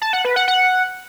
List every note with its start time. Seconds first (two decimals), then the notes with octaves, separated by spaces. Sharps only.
0.02 A5
0.13 F#5
0.25 B4
0.36 F#5
0.48 F#5